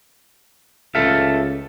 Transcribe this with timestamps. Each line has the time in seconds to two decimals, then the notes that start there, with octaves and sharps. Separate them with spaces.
0.95 C#2 A4 E5 F5